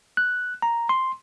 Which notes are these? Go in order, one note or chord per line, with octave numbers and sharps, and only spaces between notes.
F#6
A#5
C6